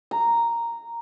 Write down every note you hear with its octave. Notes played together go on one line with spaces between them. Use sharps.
A#5